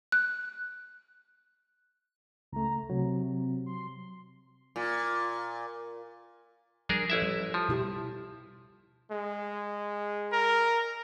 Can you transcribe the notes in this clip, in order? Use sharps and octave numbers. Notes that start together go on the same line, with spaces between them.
F#6
C#2 A3 A#5
C3 F#3
C6
A#2
F3 G3 D4 G#4 A#4
A1 E4 E5
G3
F3
B2 E4 G4
G#3
A#4